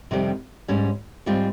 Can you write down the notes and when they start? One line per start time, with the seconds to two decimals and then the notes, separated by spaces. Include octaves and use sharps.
0.11 F2 C3 D#3 G3 C4
0.68 G#2 G3 C#4
1.26 G#2 G3 C4 F4